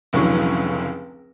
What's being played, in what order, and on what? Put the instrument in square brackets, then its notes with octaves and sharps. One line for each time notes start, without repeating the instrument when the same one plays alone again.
[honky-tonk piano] F1 C#2 D3 E3 F#3 C#6